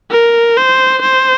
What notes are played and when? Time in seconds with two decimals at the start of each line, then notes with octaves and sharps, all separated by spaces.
0.11 A#4
0.57 C5
1.02 C5